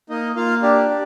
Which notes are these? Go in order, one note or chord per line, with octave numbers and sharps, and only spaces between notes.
A#3 D#4 D#5
A#3 F4 F5
D4 G4 D5
G4